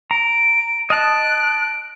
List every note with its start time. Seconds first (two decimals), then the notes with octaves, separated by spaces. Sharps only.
0.11 A#5 D7
0.90 D#5 A5 F#6 D7